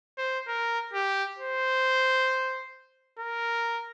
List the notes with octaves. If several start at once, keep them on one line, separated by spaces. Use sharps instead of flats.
C5
A#4
G4
C5
A#4